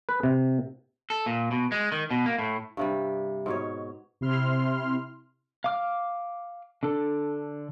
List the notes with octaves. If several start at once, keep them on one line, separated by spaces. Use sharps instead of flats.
B4
C3
A4
A#2
B2
G#3
D#3
B2
A#3
A2
G2 C3 G3
G#2 B2 C#5
C3 E4 C6 F6
F5 D6 F6
D3 D4 A4